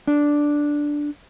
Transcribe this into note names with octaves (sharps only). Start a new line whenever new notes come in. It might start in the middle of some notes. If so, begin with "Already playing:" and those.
D4